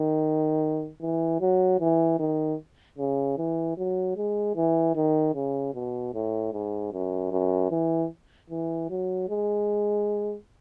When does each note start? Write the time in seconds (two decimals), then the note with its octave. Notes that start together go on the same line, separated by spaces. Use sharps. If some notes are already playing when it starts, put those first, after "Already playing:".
Already playing: D#3
1.01 E3
1.41 F#3
1.80 E3
2.19 D#3
2.98 C#3
3.38 E3
3.77 F#3
4.17 G#3
4.56 E3
4.95 D#3
5.35 C#3
5.74 B2
6.14 A2
6.53 G#2
6.92 F#2
7.32 F#2
7.71 E3
8.50 E3
8.90 F#3
9.29 G#3